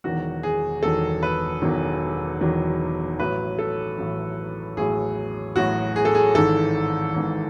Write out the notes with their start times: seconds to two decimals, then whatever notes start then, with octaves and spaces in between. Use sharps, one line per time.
0.04 E1 E2 D#3 F#3 F#4
0.43 G#4
0.83 E1 E2 D#3 F#3 A4
1.23 B4
1.62 E1 E2 D#3 F#3
2.41 E1 E2 D#3 F#3
3.19 A1 A2 F#3 B4
3.59 A4
3.98 A1 A2 F#3
4.77 A1 A2 F#3 G#4
5.56 A1 A2 F#3 F#4
5.96 G#4
6.05 A4
6.15 G#4
6.35 G#1 G#2 E3 A4
7.14 G#1 G#2 E3